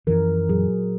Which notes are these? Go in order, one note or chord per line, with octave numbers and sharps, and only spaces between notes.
F#2 E3 F3 A#4
A#2 F#3 G#4